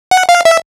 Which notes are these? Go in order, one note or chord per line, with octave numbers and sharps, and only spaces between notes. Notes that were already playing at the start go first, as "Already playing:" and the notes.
F#5
F5
E5